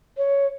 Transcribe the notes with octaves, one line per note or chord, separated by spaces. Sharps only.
C#5